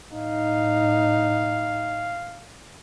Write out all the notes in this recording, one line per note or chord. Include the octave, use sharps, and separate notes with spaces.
A2 D#4 F5